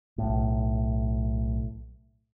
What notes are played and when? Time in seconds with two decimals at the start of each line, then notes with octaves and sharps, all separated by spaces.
0.18 B1 A2